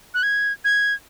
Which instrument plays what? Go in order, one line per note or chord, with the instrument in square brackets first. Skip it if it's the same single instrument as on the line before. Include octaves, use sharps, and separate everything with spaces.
[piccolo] F#6
G#6
G#6